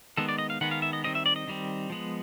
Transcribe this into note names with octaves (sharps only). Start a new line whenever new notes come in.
D#3 G#3 B3 A4
D5
D#5
F5
D#3 G#3 B3 F#5
F5
E5
D#5
D#3 G3 C4 D#5
E5
D5
D#5
D#3 G3 C4
F3 G#3 B3